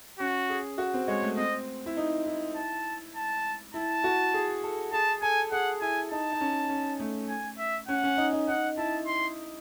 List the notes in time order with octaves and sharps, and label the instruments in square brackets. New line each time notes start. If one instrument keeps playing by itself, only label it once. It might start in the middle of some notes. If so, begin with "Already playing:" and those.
[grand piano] C#4 [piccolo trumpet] F#4
[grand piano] G#4
F#4
C4
[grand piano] G#3 [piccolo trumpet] C#5
[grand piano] A3
[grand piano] C4 [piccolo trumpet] D#5
[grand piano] E4
D#4
E4
[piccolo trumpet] A5
A5
[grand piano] E4 [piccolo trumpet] A5
[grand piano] F#4
G#4
A4
[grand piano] G#4 [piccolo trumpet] A5
[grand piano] A4 [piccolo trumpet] G#5
[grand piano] G#4 [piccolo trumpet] F#5
[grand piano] E4 [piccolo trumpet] G#5
[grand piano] D#4 [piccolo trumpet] A5
[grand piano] D#4
C#4
C#4
A3
[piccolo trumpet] G#5
E5
[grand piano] C#4 [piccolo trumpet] F#5
[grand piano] C#4
D#4
D#4
[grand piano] D#4 [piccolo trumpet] F#5
[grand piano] E4 [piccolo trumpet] A5
[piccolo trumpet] C6